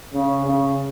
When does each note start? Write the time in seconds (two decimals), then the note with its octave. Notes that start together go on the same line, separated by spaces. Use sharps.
0.13 C#3
0.46 C#3